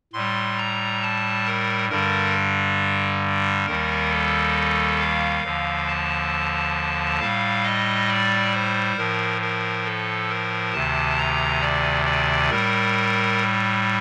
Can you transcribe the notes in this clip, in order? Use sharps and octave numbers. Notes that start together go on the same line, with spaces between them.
A2 G3 C6
A#5
A5
A#4
G2 D3 G3 A#4
D#2 D#3 G3 A#4
A4
F5
D#2 D3 F3
A5
A2 G3 F5
D#5
D5
C5
A2 F3 A#4
A#4
A4
A#4
D2 C3 D#3 A5
A#5
D5
D5
A2 G3 A#4